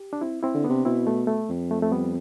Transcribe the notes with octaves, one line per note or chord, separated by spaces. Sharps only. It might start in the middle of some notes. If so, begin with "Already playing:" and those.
Already playing: G4
D4
C4 E4
C4 E4
D3
C3 B3 D4
B2 C4 E4
A3
A3
F2
A3
A3
G3 B3